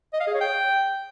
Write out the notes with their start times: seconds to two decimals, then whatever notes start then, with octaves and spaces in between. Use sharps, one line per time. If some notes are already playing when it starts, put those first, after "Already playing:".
0.13 D#5
0.20 F5
0.27 G#4
0.34 C#5
0.41 G5